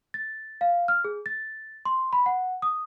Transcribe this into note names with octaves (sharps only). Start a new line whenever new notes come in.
A6
F5
F6
G#4
A6
C6
B5
F#5
D#6